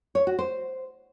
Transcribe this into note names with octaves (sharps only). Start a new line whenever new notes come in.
C#5
F#4
C5